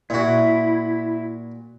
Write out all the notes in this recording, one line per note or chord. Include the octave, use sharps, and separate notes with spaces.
A#2 E4 F#4